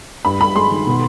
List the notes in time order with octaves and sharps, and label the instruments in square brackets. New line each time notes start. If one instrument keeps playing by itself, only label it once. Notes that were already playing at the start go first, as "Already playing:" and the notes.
[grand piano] G2 [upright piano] B5
[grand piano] G2 [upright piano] B5
[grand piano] G#3 [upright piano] C6
[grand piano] D#3
B2